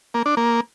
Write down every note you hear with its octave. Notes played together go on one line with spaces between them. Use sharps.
A#3
D4
A#3